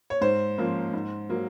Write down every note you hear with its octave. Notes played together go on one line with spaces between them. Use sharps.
C#5
G#2 C5
F3 A#3 C#4
G#2
F#3 A#3